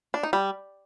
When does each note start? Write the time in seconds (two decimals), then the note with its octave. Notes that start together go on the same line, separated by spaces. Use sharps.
0.14 D4
0.23 D#4
0.33 G3